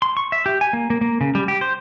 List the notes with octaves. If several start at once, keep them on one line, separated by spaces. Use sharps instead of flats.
C6
C#6
E5
G4
G#5
A#3
A#3
A#3
C#3
G3
G4
C5